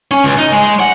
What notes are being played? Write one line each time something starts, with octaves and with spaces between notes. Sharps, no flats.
C#4
C#2
D#4
G#3
F#5